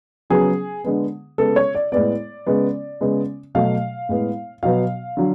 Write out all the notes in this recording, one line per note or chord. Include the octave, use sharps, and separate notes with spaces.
C#3 F#3 B3 G#4
D3 G#3 B3
C#3 G#3 B3 A4
C#5
D5
A2 G#3 B3 D5
C#3 G#3 B3
C#3 G#3 B3
B2 F#3 A3 F5
A2 G#3 B3
B2 F#3 B3 F5
D3 F#3